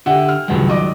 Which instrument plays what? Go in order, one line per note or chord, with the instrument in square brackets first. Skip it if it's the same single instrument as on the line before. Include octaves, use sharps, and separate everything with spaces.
[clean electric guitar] D3 [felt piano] G4 E5 F#5
[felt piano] F6
[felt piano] C#2 G2 G#3 [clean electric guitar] D#3 F#3
[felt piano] D5 D#5 D6